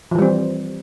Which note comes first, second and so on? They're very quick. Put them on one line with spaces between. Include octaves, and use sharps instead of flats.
F3 E3 G3 C4